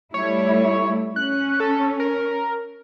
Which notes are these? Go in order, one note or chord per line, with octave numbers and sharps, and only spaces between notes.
G3 A3 E4 C#5
C#4 F#6
A4
A#4